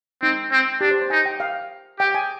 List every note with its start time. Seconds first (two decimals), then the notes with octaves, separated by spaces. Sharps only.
0.22 C4 D#4
0.52 C4
0.81 D4 G4
0.91 C5
1.01 C5
1.10 D#4 G#5
1.26 G5
1.40 F5
2.00 G4 G5
2.15 G#5